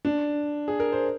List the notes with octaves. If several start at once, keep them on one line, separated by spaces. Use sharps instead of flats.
D4
G#4
A#4
C5